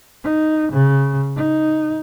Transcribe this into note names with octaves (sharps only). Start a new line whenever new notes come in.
D#4
C#3
D#4